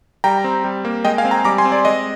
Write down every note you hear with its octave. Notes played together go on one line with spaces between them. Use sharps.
G3 G5 A#5
C4
G3
A#3
G#3 D#5 G5
F5 G#5
C4
G5 A#5
G3 A#5 D6
G#5 C6
C4
D5
G#3 D#5